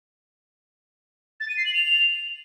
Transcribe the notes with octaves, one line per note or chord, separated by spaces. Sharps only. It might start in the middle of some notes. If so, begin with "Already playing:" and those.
A6
D#7
C7
F#7
F7